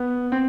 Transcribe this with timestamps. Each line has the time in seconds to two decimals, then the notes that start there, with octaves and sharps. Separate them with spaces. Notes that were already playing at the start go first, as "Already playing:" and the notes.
Already playing: B3
0.32 C4